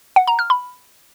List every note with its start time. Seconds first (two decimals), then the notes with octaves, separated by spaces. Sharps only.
0.16 F#5
0.27 A#5
0.39 F6
0.50 B5